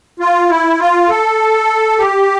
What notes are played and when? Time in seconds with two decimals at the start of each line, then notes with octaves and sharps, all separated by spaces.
0.20 F4
0.49 E4
0.79 F4
1.09 A4
1.98 G4